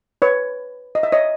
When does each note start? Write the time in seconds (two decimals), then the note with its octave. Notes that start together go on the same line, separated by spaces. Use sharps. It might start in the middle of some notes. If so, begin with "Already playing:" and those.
0.22 B4 C#5
0.95 D#5
1.03 E5
1.12 C#5 D#5